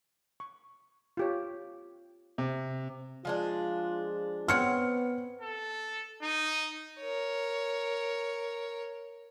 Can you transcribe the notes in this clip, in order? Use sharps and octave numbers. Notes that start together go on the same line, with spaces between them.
C#6
F4 G4 C#5
C3 E5
F3 G#3 D4 F4
B3 C4 C#5 F#5 F6 C#7
A4
D#4
A#4 C#5